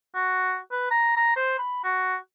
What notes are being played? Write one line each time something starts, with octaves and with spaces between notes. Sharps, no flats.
F#4
B4
A#5
A#5
C5
B5
F#4